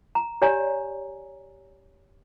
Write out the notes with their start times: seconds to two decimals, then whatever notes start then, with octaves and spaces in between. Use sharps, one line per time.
0.15 A#5
0.42 G4 C#5 D5 G#5 A#5